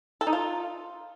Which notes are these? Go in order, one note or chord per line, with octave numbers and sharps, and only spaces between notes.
A4
D#4
F4